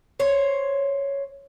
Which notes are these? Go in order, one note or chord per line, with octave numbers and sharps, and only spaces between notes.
C5 C#5